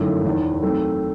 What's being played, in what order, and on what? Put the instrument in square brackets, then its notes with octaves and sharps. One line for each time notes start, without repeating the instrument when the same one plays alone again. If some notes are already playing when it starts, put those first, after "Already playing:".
Already playing: [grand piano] G1 F#2 D#3 A3 E4
E1 E2 D#3
D#3 F#3 A3 C4